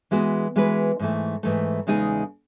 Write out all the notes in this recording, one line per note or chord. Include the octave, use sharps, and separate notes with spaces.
E3 G#3 B3 F#4 B4
E3 G#3 B3 F#4 B4
G#2 E3 A3
G#2 E3 A3
E2 C#3 G#3 D#4 G#4